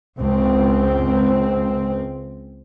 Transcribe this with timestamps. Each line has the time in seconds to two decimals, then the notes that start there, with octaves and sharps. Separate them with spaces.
0.19 C#2 C4